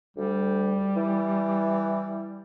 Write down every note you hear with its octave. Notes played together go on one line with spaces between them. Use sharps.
D2 G3
E3